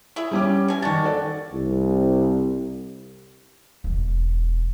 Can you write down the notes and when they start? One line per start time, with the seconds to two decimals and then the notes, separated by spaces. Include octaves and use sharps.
0.16 E4 G#4 E5
0.31 G3 C#4 D6
0.68 B2 G#5
0.82 D#3 D4 F#4 A6
1.04 A4 D5
1.53 C2
3.84 E1